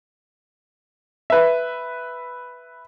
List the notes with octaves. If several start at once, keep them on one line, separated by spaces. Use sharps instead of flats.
B4 E5